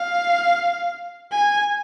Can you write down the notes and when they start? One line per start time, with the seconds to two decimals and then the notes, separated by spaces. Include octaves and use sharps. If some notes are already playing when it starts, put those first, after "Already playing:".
Already playing: F5
1.32 G#5